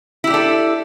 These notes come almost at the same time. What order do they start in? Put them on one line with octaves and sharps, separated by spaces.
E4 G4 D4 A4